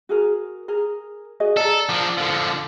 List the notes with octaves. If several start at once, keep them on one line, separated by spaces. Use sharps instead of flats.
F#4 G#4 A#4
G#4 A#4
F#4 G#4 D#5
G#4 A4 D5 A#5
F3 D4
D3 F3